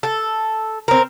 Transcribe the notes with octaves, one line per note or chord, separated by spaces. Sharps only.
A4
C4 A#4